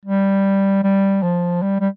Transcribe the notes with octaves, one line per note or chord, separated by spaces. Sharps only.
G3
G3
F3
G3
G3